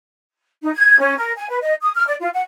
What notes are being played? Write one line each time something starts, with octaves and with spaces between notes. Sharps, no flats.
D#4
G#6
C#4
A#4
G#5
B4
D#5
D#6
F6
D5
F4
F#5